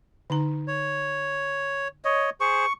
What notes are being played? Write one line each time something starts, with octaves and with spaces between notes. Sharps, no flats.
D3 D#4 A#5
C#5
C#5 D#5
G#4 C5 C#6